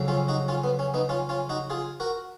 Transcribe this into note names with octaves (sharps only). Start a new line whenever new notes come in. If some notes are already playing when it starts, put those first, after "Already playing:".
Already playing: F2 C#3 F#3
C#4 F4
D#4 F#4
C#4 F4
B3
C#4
B3 D#4
C#4 F4
C#4 F4
D#4 F#4
F4 G#4
F#4 A#4